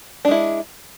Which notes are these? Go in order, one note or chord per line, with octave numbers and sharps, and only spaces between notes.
G#3 D4 E4